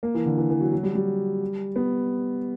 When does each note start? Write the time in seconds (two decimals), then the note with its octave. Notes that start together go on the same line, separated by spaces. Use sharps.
0.03 A#3
0.14 E3
0.26 D3
0.37 E3
0.50 E3
0.60 F#3
0.73 F#3
0.83 G3
0.95 G3
1.76 B3